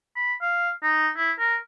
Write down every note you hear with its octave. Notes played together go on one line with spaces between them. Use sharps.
B5
F5
D#4
E4
A#4